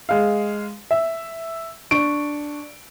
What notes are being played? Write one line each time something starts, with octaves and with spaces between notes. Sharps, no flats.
G#3 F5
E5
D4 C#6 D7